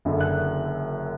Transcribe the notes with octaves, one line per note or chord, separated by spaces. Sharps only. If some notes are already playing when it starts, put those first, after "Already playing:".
F#1 F#2 D3
F#6